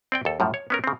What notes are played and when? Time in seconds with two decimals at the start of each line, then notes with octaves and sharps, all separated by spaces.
0.12 C4 D5 G5
0.25 D#2 A4
0.40 F#2 A2 F3 G3
0.54 C#5
0.70 B3 C#4 A#4
0.84 C#3 C4